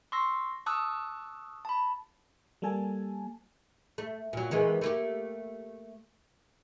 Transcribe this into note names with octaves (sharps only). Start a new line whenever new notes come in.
C6 C#6 E6 A#6
A5 C#6 D#6 E6 F#6
A5 B5
G3 A#3 A4 G#5 A5
A3
A#2 F#3
D#3 E3 G#3
A3 A#3 G4